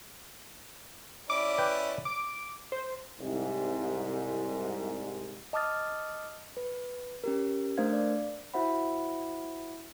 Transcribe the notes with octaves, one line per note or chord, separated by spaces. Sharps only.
C#4 E4 D5 D6
B4 G5
D6
C5
C2 G#2
D#5 A5 D6 D#6 F6 A6
B4
C#4 G4 A#4
A3 D4 A#4 C5 F5 G#6
D5
E4 F#4 C5 E5 F#5 B5